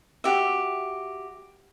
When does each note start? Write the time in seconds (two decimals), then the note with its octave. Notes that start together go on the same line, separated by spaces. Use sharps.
0.24 F#4 G4 E5